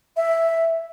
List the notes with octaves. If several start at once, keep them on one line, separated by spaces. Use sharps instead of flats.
E5